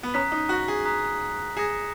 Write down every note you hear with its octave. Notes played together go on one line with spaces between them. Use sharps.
B3
C#4 A#5 D#6 F#6 B6
D#4
F#4
G#4
A#5 D#6 F#6 B6
G#4 D#6 A#6 C#7 E7